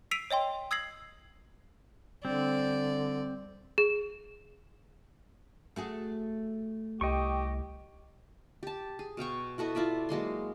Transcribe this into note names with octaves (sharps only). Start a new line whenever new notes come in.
E6 B6 C7 D7 D#7 F7
C#5 D#5 G5 C6
D#6 E6 G#6 A#6 C7 F#7
D3 G3 C4 D4 D5
G#4
A3 F#4 G#4
C2 G4 D#5 G5 C#6
G4 A5
G#4
B2 F5 G5 C#6
E4 F#4 A4 D#5
E4 F4 D5 E5
F#3 G#3 A#3 C6